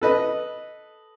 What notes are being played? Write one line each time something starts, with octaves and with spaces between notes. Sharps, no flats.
A4 B4 D#5